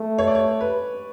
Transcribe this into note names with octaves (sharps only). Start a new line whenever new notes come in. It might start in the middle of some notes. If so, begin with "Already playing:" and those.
Already playing: A3
C#5
D5
C#5
B4